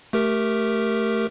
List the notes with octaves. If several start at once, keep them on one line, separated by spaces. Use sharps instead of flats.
A3 G4 A#4